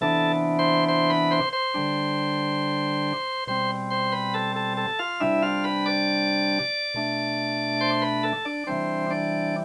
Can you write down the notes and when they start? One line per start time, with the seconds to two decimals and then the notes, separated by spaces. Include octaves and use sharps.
0.01 C3 E3 B3 D4 A4 A5
0.59 C5 C6
0.88 C5 C6
1.10 B4 B5
1.31 C5 C6
1.53 C5 C6
1.74 D3 G3 D4
3.47 B2 G3 C4 C5 C6
3.91 C5 C6
4.12 B4 B5
4.34 A4 A5
4.55 A4 A5
4.77 A4 A5
4.99 F4 F5
5.20 C3 G3 D4 E4 E5
5.42 F4 F5
5.64 B4 B5
5.86 D5 D6
6.94 B2 A3 D4
7.81 C5 C6
8.02 B4 B5
8.23 A4 A5
8.45 D4 D5
8.67 C3 E3 G3 C4 D4 C5
9.10 D4 D5